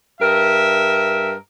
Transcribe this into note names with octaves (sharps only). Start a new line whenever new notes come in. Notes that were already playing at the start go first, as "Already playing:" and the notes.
G2 A#4 E5